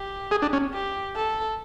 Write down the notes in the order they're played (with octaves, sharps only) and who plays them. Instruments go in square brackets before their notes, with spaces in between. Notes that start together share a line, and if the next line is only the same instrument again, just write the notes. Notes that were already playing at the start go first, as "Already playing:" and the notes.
Already playing: [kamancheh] G4
[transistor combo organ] G#4
D4
C#4
[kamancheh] G4
A4